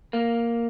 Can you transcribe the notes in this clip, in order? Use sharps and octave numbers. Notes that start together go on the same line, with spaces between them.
A#3